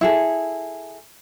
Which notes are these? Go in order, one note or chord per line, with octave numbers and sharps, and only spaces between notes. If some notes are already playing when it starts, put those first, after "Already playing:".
E4 G#4 A4